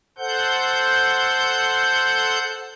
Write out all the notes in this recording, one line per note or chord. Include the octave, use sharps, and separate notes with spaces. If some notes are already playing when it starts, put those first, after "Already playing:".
A4 C5 F#5 G6